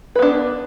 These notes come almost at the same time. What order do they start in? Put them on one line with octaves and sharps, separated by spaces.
B4 B3 D4